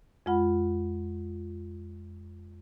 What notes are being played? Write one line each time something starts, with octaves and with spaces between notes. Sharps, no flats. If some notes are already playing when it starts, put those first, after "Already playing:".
F2 G#3 F4 F#5 B5